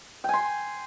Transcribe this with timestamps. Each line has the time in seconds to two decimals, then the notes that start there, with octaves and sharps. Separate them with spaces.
0.24 G5
0.29 G#5
0.33 C6